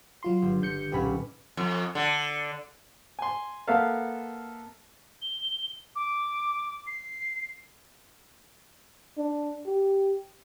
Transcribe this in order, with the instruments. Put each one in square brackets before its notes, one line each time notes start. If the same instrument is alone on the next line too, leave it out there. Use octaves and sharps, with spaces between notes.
[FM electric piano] F#3 F4 C6
[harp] G1
[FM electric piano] D3 G6 C#7
[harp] B1 A#2 C#4 [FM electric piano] G4 B5
[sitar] F2
D3
[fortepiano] G#5 C6
A#3 B3 A4 E5 F5
[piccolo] G7
D6
C7
[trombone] D4
G4